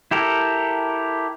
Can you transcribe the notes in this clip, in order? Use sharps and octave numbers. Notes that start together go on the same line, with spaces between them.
E4 G4 A4 A#4